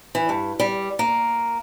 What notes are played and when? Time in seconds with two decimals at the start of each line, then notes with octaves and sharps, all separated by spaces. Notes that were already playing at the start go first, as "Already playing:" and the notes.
0.15 E3
0.29 G2
0.60 G3
0.99 A#3